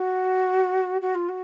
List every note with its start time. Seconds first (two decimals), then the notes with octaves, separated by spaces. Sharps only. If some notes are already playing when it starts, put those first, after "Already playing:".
Already playing: F#4
1.01 F#4
1.15 F4
1.29 F#4